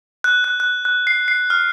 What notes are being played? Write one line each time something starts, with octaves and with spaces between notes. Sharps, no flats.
F#6
F#6
F#6
F#6
C7
C7
F6